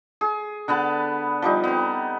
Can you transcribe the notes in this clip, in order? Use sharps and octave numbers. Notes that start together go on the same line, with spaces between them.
G#4
D3 B3 A5 B5
F3 G3 D#4
B3 C4